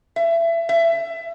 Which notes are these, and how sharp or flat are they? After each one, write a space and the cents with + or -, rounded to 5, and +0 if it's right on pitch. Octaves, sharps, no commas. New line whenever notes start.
E5 +25
E5 +20